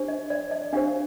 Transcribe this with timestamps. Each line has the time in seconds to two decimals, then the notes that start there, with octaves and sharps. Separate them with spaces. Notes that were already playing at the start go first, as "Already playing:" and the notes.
Already playing: D4 G4 C5
0.08 D#5
0.30 D5
0.51 D#5
0.73 D4 G4 C5 F5